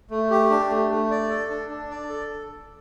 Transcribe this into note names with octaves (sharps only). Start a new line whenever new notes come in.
A3
G4
D4
A3
A3
D5
A4
D4
D4
D5
A4